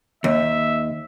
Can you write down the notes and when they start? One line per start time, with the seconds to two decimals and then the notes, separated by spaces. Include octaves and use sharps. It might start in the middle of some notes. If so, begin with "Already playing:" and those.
0.24 D#2 E5